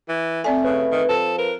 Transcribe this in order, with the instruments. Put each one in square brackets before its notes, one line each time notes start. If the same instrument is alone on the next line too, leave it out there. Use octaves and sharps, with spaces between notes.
[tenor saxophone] E3
[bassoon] A3 [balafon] C4 D5 G#5
[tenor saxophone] C#3 [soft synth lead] B4
[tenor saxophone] D#3
[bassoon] F3 [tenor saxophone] A4
[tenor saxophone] A#4 [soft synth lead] B4